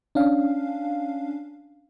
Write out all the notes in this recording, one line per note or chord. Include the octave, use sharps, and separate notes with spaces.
C#4 D4 F5